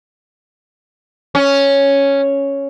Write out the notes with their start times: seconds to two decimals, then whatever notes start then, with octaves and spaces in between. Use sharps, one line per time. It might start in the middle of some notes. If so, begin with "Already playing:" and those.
1.35 C#4